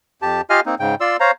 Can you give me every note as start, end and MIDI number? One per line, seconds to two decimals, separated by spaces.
0.22 0.41 41
0.22 0.41 67
0.22 0.41 81
0.50 0.60 65
0.50 0.60 67
0.50 0.60 75
0.50 0.60 77
0.50 0.60 80
0.50 0.60 89
0.66 0.75 58
0.66 0.75 60
0.66 0.75 63
0.80 0.95 44
0.80 0.95 49
0.80 0.95 79
1.01 1.17 65
1.01 1.17 74
1.01 1.17 84
1.01 1.17 88
1.20 1.31 72
1.20 1.31 73
1.20 1.31 77
1.20 1.31 82